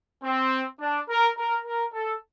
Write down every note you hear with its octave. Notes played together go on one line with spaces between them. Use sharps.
C4
D4
A#4
A#4
A#4
A4